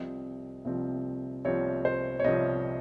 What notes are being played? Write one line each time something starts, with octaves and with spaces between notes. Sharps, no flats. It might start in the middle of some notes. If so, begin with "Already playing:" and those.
Already playing: C2 C3 F3 C4 D#5
C2 C3 F3 C4
C2 C3 F3 C4 C#5
C5
C#5
C2 C3 F3 C4 D#5